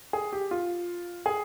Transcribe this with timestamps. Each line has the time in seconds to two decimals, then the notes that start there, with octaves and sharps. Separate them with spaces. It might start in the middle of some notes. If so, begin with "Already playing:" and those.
0.13 G#4
0.33 G4
0.51 F4
1.26 G#4